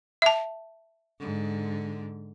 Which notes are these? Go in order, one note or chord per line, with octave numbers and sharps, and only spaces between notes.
E5 A5
G#2 D3